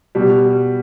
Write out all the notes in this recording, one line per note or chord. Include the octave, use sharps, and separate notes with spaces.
B2 G3